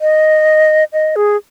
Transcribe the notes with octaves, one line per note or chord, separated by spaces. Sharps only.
D#5
D#5
G#4